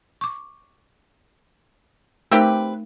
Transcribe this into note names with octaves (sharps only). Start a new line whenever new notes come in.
C#6 D6
A3 C4 D#4 G4 A#4 B4